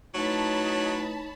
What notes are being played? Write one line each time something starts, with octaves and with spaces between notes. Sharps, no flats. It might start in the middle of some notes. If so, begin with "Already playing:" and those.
F#3 A3 D#4 E4 B4 C#5 A5 B5